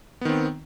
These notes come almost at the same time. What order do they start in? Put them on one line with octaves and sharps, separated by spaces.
B3 D#3 C4